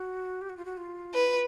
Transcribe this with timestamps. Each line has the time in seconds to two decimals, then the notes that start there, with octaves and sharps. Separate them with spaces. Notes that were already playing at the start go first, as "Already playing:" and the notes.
Already playing: F#4
0.42 G4
0.49 F#4
0.57 F4
0.65 F#4
0.77 F4
1.14 E4 B4
1.27 F4